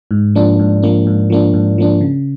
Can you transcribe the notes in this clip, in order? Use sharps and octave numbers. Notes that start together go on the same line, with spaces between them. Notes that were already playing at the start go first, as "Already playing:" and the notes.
G#2
F3 A#3 D4
G#2
F3 A#3 D4
G#2
F3 A#3 D4
G#2
F3 A#3 D4
C#3